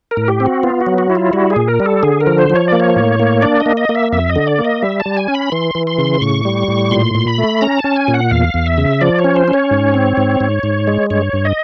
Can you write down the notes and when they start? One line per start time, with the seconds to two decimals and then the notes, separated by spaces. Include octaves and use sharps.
0.11 A#4
0.17 A2
0.28 G4
0.40 C4
0.46 F#4
0.63 B3 F4
0.81 F#4
0.86 F#3
0.98 F#4
1.09 E4
1.15 F4
1.33 G3 F#4
1.50 G#4
1.56 A#2
1.68 A#4
1.80 G3
1.86 A4
2.03 D3 G#4
2.21 A#4
2.27 F3
2.38 C5
2.50 F3
2.55 C#5
2.68 A#3 D5
2.80 C#5
2.96 A2
3.20 A#3
3.42 D4 D5
3.60 D#5
3.66 A#3
3.77 D#5
3.89 A#3
3.95 E5
4.12 F2 E5
4.30 D#5
4.36 D3
4.47 D5
4.59 A#3
4.65 D#5
4.82 G3 E5
5.00 A5
5.06 G3
5.17 G#5
5.28 C#4
5.34 B5
5.52 E3 C6
5.75 E3
5.87 C6
5.98 C#3
6.21 A2 C#6
6.45 G3
6.68 A2
6.91 A#2 C6
7.15 A#2
7.27 B5
7.38 A3
7.61 C#4 A#5
7.79 A5
7.84 C#4
7.96 G#5
8.08 A#2
8.14 F#5
8.31 E2 F5
8.54 E2
8.66 E5
8.78 C#3
9.01 F3 D5
9.19 C#5
9.24 C#4
9.36 C5
9.48 C#4
9.53 C#5
9.71 G#2
9.94 C4
10.17 G#2
10.40 G#2
10.63 G#2
10.87 G#3
11.10 G2 C#5
11.33 G2
11.45 D#5